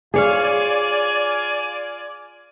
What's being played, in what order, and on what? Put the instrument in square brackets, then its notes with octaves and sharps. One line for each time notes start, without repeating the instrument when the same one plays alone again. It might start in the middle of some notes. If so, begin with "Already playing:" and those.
[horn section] F4 D5 G#5 [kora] G#4 C#5 F5